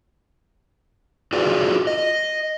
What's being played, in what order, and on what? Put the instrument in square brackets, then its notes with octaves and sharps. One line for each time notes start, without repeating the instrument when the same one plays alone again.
[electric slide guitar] F4 F#4 G#4 A4 B4 D5
D#5